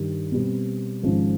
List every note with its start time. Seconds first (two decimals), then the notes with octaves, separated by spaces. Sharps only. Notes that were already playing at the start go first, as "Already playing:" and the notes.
Already playing: G2 D#3 G3
0.32 B2 G3 C4
1.03 G#1 G#2 F3 G#3 C#4